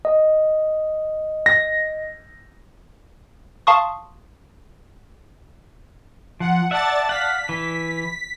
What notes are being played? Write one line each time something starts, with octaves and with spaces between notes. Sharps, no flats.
D#5
A#6
F5 A5 C6 C#6 D#6
F3 F#5
D5 E5 F#5 A5 A6
F5 F#5 B6
E3